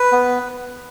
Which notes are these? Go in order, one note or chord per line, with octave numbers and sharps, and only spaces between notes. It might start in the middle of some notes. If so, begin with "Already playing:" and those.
Already playing: B4
B3